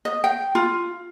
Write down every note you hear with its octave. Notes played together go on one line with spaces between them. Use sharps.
D#5
G5
F4